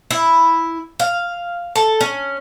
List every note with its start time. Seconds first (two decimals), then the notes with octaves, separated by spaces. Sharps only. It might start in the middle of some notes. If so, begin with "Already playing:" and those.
0.10 E4
1.00 F5
1.76 A4
2.01 C#4